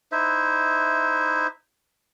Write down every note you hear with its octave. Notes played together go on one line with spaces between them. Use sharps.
D#4 E4 C5 E5